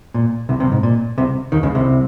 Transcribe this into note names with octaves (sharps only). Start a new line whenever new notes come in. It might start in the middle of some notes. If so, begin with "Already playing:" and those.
A#2
C2 C3
C2 C3
G#2
A#2
C2 C3
D#2 D#3
C#2 C#3
C2 C3